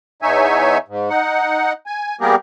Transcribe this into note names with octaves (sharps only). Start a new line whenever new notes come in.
E2 D#4 C#5 E5 G#5
G#2
D#4 F#5
G#5
G3 A#3 B3 G4 G#4 A#4